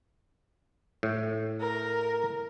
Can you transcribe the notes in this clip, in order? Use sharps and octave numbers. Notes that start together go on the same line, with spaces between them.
A2
A#4